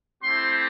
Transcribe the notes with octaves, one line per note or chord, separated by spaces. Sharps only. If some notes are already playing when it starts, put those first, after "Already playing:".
A3 C4 E4 G4 C6